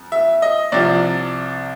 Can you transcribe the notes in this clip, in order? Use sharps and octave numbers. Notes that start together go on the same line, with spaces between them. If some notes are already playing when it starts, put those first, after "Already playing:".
Already playing: F2
E5
D#5
C2 C3 F3 D5